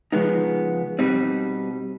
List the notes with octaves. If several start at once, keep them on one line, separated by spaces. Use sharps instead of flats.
C#3 F3 G#3 B3 D#4
B2 G3 C4 D#4